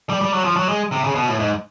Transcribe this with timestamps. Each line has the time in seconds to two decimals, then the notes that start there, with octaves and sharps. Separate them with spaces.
0.09 G3
0.21 G3
0.33 F#3
0.44 F3
0.57 F#3
0.69 G#3
0.92 C3
1.04 C#3
1.15 B2
1.28 A2
1.40 G#2